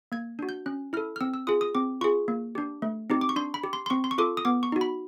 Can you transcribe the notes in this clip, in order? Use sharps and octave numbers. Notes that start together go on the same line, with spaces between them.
A#3 G#6
D4 F#4
G6
C#4 F#6
E4 A4 F6
F6
C4 E6
E6
F4 G#4 D#6
D#6
C4 D6
F4 G#4 C#6
A#3
D4 G4
A3
C4 D#4 G4
D6
C#6
D4 C6
B5
G4
C6
C6
C4 C#6
C6
C#6
F4 A4 D6
D#6
B3 D6
C#6
D#4 F#4
B5